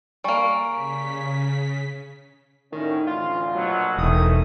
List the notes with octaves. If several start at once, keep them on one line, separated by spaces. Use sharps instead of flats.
G3 A#3 G#5 C#6
C#3 B6
A2 D3 D#3 C#4
A1 D2 F4
A#1 B2 F#3
E1 D#3 E3 A3 D#6